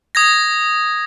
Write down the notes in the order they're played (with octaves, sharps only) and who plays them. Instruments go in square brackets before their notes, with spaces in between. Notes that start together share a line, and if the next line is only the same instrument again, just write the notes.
[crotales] D#6 G#6 A#6